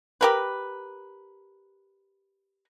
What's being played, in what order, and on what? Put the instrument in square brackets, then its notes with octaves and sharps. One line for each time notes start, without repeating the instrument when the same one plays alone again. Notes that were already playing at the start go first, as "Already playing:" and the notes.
[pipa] G4 A#4 B4